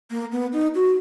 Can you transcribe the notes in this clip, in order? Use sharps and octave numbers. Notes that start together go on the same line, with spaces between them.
A#3
B3
D#4
F#4